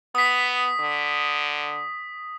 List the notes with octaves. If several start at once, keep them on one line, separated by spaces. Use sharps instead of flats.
B3 D#6 B6
D3